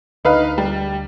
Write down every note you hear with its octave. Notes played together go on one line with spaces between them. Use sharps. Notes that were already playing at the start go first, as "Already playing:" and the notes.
D2 D#4 B4 F5
G3